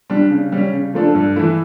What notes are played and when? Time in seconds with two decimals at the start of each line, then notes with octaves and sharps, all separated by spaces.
0.10 G3 D4
0.30 C#3
0.52 G3 C#4
0.73 C#3
0.94 F3 A3 D4 A4
1.15 G2
1.36 E3 A3 E4